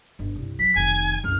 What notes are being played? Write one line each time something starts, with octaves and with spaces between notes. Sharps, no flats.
G1
C2
F#3 B6
F1 D#3 G#5
F#1 C2 F6